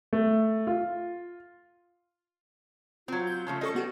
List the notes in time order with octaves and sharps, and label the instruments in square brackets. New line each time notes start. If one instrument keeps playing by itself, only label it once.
[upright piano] A3
F4
[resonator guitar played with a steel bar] F#3 C4 [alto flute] F4
[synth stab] G6
[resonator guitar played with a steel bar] C#3 F3 A3
[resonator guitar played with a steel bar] G3 D#5 [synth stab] C#4 A4 C#6
[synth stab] B3 F#4 G4